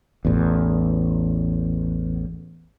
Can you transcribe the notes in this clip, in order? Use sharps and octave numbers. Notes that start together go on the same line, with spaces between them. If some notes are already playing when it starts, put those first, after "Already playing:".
A1 E2